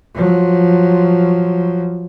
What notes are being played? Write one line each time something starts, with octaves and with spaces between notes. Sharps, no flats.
F3 F#3